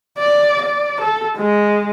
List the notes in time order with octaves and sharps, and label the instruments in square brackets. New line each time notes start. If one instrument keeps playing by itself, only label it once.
[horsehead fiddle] D5
D5
A4
G#3